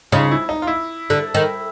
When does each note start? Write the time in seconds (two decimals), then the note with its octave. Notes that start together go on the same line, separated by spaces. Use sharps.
0.12 C#3 D#4 F4
0.31 E4
0.49 D#4
0.62 F4
0.67 E4
1.10 D3
1.34 D#3